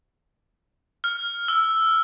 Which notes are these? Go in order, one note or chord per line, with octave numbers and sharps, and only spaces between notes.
F6
E6